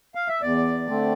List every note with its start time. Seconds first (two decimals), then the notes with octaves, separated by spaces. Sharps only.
0.15 F5
0.28 E5
0.41 E2 D5
0.87 D3 A3 C4